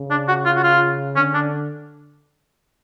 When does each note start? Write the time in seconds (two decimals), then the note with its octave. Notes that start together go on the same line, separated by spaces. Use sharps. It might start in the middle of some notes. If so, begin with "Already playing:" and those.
Already playing: C#3
0.10 D4
0.28 F#4
0.45 F4
0.56 F#4
0.63 F4
1.16 D3 C#4
1.34 D4